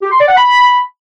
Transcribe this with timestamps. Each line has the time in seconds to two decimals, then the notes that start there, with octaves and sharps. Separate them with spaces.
0.02 G4
0.11 C6
0.19 D5
0.28 F#5
0.37 B5